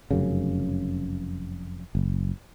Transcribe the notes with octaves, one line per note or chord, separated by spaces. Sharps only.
F1 F#2 C#3
F#1